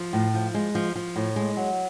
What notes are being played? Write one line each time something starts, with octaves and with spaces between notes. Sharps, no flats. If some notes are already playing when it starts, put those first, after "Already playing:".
Already playing: F3
A2
F3
G#3
F3
F3
A2
G#3
F#3